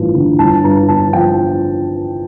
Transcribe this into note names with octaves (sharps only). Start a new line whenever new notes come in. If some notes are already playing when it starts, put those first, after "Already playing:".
Already playing: A1 G2 F3
D3
G1 A5
G2 A#5
G1 A5
F3 G5